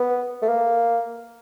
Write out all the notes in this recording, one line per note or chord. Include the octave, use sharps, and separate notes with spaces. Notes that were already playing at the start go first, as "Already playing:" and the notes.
Already playing: B3
A3
A#3